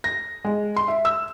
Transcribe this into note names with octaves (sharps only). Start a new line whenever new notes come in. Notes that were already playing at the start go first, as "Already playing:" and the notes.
A#6
G#3
C6
E5
E6